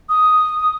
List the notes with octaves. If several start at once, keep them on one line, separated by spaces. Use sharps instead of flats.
D#6